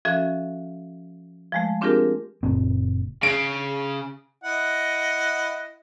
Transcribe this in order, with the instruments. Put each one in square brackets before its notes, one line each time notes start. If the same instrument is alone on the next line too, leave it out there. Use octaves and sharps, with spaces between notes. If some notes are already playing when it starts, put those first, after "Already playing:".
[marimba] F3 C#4 F#4 A4 E5
F3 G#3 A3
C4 D4 F4 G4 G#4 A#4
[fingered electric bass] F#1 A#2 C4
[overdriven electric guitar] C#3 [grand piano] D7
[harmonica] E4 D#5 F#5